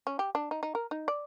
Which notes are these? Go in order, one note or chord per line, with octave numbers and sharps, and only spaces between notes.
C#4
G4
D4
D#4
D#4
A#4
D#4
D5